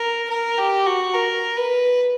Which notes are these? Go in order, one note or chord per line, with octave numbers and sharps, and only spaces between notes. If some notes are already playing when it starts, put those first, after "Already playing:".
Already playing: A#4
A#4
G4
F#4
A#4
B4